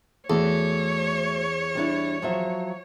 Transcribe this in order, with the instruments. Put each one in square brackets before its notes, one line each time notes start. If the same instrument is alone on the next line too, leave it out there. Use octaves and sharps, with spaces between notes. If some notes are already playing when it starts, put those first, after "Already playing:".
[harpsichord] E2 [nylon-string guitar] A3 F#4 A4 [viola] C#5
[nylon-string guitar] G3 D4 E4
F3 F#3 E5